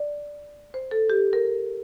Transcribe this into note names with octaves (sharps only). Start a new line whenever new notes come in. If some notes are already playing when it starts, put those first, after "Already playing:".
Already playing: D5
C5
A4
G4
A#4